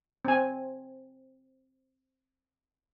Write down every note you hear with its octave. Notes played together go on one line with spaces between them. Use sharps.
C4 G#5